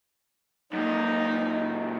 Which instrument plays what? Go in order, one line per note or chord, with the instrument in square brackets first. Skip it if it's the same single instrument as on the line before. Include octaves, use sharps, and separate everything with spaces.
[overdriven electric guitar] F#2 A#2 [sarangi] D#4